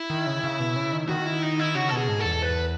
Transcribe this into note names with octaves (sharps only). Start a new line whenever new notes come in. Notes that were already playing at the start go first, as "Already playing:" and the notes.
Already playing: E4
D#3
C#3
C#3
B2
C#3
D#3
D#3 F#4
E4
D#4
E4
C#3 F#4
A4
B2 G#4
G#2
A4
E2
B4